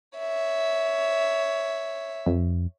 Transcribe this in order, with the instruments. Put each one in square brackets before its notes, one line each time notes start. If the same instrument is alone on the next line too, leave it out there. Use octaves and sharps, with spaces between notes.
[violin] C#5 E5
[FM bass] F2